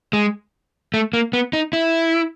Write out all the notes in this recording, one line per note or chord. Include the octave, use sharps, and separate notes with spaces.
G#3
A3
A#3
B3
D#4
E4